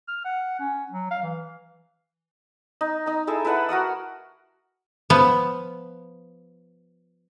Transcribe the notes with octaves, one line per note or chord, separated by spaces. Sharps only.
F6
F#5
C#4
F#3
F5
E3
D#4
D#4 A#5
E4 G#4 A4 E5
E4 A4 B4 F#5
F#4 A#4 F#5 D#6
F3 B3